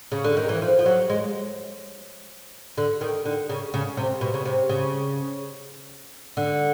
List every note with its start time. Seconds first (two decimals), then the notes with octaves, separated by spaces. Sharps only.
0.12 C#3
0.24 D3
0.37 D#3
0.49 E3
0.62 F3
0.79 F3
0.86 F#3
1.10 G#3
2.78 D3
3.01 D#3
3.25 D3
3.49 C#3
3.74 C#3
3.97 C3
4.21 B2
4.34 C#3
4.45 C3
4.69 C#3
6.37 D3